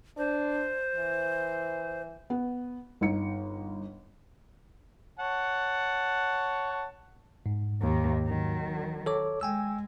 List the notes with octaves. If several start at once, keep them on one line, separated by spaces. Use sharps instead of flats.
D4 C5
E3
B3
G1 D#4 C#7
C#5 F#5 A5
G#2
D#2 D#3
D#3 F#3
A4 C#5 D6
G#3 G5 G#5 E6